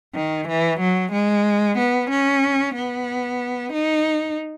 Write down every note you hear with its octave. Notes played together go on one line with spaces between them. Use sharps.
D#3
E3
F#3
G#3
B3
C#4
B3
D#4